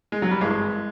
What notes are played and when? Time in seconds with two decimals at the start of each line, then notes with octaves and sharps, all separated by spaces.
0.12 G#3
0.22 F#3
0.31 G3
0.41 G#1 G2 E3 G#3